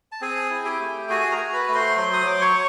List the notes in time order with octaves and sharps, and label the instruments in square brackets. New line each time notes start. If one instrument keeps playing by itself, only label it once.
[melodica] A5
C4 G#4 G#5
E4
G4 G5
A3
F#4 G#4 G#5
A#4 A#5
F#4
B4 B5
A3 B5
C5 C6
F#3 C5 C6
D#6
F#3 D6
C#5 C#6